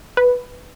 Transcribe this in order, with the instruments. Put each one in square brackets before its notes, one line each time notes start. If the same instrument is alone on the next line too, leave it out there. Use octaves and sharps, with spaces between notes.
[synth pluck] B4